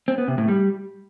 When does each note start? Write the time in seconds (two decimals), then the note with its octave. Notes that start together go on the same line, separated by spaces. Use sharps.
0.08 C4
0.18 B3
0.28 C3
0.38 A2
0.48 G3